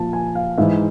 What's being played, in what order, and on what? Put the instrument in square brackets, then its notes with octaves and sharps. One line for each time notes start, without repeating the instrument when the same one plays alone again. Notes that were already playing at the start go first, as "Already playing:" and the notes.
Already playing: [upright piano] A#2 F3 A5
G#5
F5
G#2 E3 E5